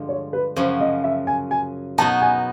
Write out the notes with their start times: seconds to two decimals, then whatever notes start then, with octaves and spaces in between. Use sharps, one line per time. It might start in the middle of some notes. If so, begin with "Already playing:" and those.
Already playing: G2 D3 F3 G#3
0.09 C#5
0.33 B4
0.56 F#2 C#3 F3 C5
0.80 D#5
1.04 E5
1.27 G#5
1.51 G#5
1.98 B2 F#3 B3 D#4 A5
2.22 G#5